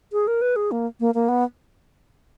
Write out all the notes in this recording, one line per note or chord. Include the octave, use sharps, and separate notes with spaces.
G#4
A#4
B4
G#4
A#3
A#3
A#3
B3